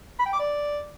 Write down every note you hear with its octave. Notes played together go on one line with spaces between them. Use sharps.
B5
G5
D6
D5